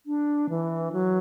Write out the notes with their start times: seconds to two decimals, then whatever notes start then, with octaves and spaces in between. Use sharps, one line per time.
0.06 D4
0.49 E3
0.92 F#3